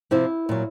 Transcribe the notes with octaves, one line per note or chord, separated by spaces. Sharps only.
C3 F3 E4
A#2 F#3